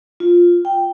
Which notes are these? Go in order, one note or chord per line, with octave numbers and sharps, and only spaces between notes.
F4
G5